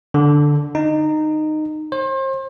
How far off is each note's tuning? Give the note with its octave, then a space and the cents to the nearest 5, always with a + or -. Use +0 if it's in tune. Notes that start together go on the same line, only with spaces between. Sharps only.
D3 +0
D#4 -15
C5 +35